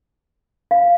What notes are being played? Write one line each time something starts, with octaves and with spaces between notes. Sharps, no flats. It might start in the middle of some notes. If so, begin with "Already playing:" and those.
F5